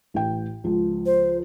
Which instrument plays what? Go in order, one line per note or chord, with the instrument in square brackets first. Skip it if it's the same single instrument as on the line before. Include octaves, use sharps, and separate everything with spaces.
[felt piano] A1 G5
C#2 F3
[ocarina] C5